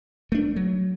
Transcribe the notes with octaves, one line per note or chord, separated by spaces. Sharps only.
A3 D4
F#3